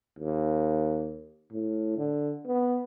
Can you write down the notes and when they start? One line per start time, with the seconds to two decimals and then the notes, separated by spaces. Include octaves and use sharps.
0.19 D#2
1.52 A2
1.97 D3
2.47 B3